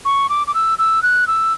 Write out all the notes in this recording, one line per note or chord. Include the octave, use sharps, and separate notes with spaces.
C#6
D6
D6
E6
E6
F#6
E6